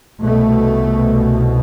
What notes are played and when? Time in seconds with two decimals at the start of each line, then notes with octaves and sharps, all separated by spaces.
0.20 C2 B2 A3